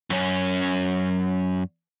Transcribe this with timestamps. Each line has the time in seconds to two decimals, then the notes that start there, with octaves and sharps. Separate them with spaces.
0.10 F#2 C#4